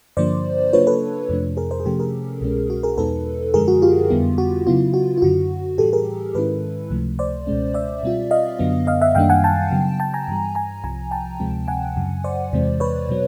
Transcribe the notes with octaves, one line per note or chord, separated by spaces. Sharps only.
G2 D3 F3 A#3 D4 C5 D5
C#3 F#3 A#3 D4 F4 B4 C#5
A4 B4
F2 C3 F3 A3 D4
G#4 A#4
A#4 C5
G#4
C3 F3 A3 C#4 G4 A4
G#4 A#4
C2 B2 G#3 C#4
F#4
G#4 A#4
E2 B2 G#3 B3 D#4 A4 B4
F#2 D3 F3 G#3 G#4 A#4
F#4
F4 G4
F2 D3 G3 B3 E4
F#4
C#3 F#3 B3 E4 F4
F#4
F4
F#2 D3 F#3 F#4
A2 E3 G3 G4 A4
G#4 A#4
G#2 D#3 G#3 C#4 E4 A4 B4
C#2 C3 F3 A3
C5 D5
C#2 B2 G#3 C#4
D5 E5
B2 G3 C4 F4
D#5 F5
F#2 D3 F#3 B3
D#5 F5
E5 F#5
F#2 D#3 G3 A#3 D4 F5 G5
F#5 G#5
G5 A5
C#3 F#3 B3
G5 A5
G#5 A#5
G2 E3 G3
G#5 A#5
C2 C3 F3 G#5 A#5
G5 A5
D2 C3 F3 G#3 C4
F#5 G#5
F#2 C#3 F#3
C5 D5
E2 C3 E3 G#3 C4
B4 C#5
B2 F#3 B3